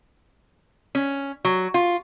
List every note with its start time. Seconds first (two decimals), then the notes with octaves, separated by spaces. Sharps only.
0.95 C#4
1.45 F#3
1.74 F4